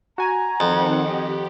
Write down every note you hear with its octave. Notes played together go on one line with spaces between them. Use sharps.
F#4 G#5 A#5
F2 D#3 C4 F#5
G4 D#5